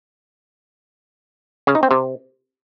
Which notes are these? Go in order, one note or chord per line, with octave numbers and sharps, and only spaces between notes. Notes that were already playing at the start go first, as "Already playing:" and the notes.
C#3
D#4
C4
C3